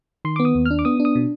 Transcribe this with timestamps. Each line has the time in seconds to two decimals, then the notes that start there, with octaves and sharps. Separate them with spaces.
0.25 D#3 C6
0.36 D6
0.40 B3
0.45 D#6
0.55 D#2
0.66 F6
0.71 D4
0.79 D6
0.85 B3 D#6
1.00 D4
1.05 D#6
1.15 B2